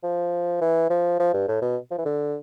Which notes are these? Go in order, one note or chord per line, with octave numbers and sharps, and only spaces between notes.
F3
E3
F3
F3
G2
A2
B2
F3
E3
D3